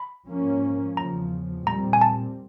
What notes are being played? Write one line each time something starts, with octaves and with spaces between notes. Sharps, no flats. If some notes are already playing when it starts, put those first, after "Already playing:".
Already playing: B5
G#2 F3 A#3 C#4
E2 C#3 F3 A#5
A#2 G3 C4 A#5
G#5
A5